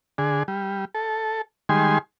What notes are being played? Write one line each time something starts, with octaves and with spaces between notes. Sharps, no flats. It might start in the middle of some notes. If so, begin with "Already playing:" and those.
D3 G#4
G3
A4
D#3 G3 G#3 G#5 C6